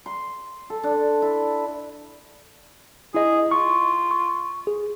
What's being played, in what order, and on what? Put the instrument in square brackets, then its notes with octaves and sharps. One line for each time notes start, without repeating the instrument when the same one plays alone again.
[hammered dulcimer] C6
A4
D4
E4
[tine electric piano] E4 D#5 [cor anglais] G#4
[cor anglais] F4 [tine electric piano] C#6
[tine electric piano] C#6
G#4